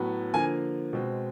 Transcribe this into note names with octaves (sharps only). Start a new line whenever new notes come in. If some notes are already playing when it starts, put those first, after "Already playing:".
Already playing: A2 F#3 B3
D3 F3 A#3 G#5
B2 G#3 C4